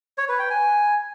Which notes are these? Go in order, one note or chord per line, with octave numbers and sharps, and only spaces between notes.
C#5
B4
G5
G#5